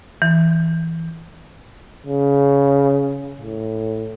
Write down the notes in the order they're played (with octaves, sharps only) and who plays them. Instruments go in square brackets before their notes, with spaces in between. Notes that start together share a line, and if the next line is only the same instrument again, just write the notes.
[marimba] E3
[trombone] C#3
A2